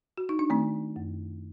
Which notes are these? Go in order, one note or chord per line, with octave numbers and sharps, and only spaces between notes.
F#4
D#4
D4
D#3 A3 C4
F#2